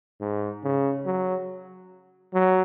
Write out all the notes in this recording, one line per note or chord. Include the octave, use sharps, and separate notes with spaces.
G#2
C#3
F#3
F#3